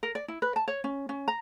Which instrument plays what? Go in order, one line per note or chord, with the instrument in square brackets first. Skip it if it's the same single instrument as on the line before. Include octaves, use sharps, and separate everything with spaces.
[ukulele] A#4
D5
E4
B4
A5
C#5
C#4
C#4
A#5